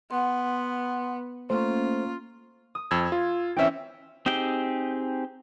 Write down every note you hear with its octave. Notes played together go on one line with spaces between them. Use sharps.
B3 F#5 C6
A3 A#3 C#4 F4 C5
D#6
F2 E6 G#6
F4
E3 C4 C#4 E5 G5
C4 D#4 G4 G#4 G5